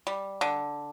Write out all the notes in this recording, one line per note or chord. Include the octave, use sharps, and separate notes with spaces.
G3
D3